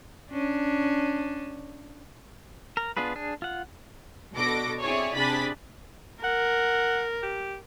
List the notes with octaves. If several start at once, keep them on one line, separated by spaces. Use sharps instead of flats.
C#4 D4
A#4
B3 D4 F4 G#4 B4
D4 G#4
F4 F#5
B2 D4 A4 D6 A#6
C4 E4 G#4 C#5 D5
C3 D4 G#4 B5 A6 B6
A#4 F#5
G4